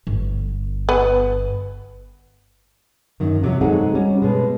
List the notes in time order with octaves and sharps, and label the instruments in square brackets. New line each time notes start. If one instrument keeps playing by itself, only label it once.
[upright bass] G1
[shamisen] B3
[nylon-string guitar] F#2 D#3
F2 C3 F#3
G#3 C4 D#4 F#4 G#4 A4
G3 C#4
B2 G#3